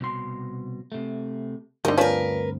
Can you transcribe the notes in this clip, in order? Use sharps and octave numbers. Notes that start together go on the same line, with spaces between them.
C2 B2 C6
C3 A3
D2 G2 D3 C4 D#4 A#4
F3 C#4 D4 A#4 B4